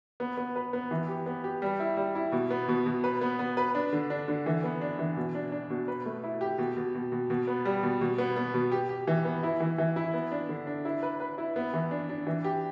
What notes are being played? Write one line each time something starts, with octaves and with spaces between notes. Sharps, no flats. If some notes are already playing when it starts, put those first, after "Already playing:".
B3
B3
B4
B3
E3
G4
B3
G4
G3
E4
G3
E4
B2
B3
B2
B2
B4
B3
B3
B4
D4
D3
D4
D3
E3
B3
D4
E3
B2
D4
D4
B2
B4
A3
E4
G4
B2
B2
B2
B2
B2
B3
G3
B2
B2
B3
B3
B2
G4
G4
E3
B3
E4
E3
E3
E4
B3
D4
D3
D4
E4
B4
B4
E4
B3
E3
D4
D4
E3
G4